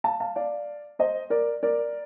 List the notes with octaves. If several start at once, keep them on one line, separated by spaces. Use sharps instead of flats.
F5 A5
F5 A5
D5 F5
C5 D#5
A#4 D5
A#4 D5